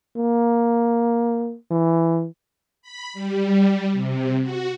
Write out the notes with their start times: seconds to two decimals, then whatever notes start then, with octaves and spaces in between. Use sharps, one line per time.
0.17 A#3
1.71 E3
2.82 B5
3.13 G3
3.93 C3
4.42 F#4